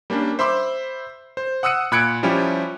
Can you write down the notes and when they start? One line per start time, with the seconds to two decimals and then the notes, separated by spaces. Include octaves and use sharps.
0.10 G3 A#3 C#4 D4
0.39 C5 E5 B5 C6 D6 E6
1.37 C5
1.63 F#5 D#6 E6 F#6 C#7 D#7
1.92 A#2 B5 F#6 G#6 C#7 D7
2.23 F3 G3 C#4 E4 G4